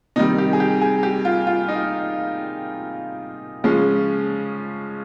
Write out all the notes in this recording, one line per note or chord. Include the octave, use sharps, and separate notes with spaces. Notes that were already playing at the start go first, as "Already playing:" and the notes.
C3 D#3 G3 D#4
G4
G#4
G4
G#4
G4
F4
F4
D#4
C#3 F3 G#3 C#4